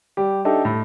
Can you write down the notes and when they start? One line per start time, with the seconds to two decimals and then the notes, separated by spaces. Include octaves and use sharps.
0.17 G3 G4
0.45 D4 D#4 G4 A4 E5
0.65 A2